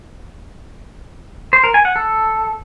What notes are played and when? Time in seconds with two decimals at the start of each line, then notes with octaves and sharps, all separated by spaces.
1.53 C5
1.64 A#4
1.74 G#5
1.85 F#5
1.96 A4